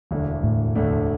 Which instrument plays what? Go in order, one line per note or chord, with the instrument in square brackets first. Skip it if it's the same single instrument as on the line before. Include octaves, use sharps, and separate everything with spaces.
[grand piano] E1 D2 D3 A3 D4
[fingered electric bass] A2
[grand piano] E1 D2 D3 A3 D4